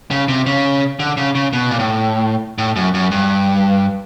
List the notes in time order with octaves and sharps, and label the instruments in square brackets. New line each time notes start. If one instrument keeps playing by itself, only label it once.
[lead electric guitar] C#3
C3
C#3
D3
C#3
C#3
B2
A#2
A2
A2
F#2
F#2
G2